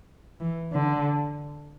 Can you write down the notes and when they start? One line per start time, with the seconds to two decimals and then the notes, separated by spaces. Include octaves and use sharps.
0.40 E3
0.73 D3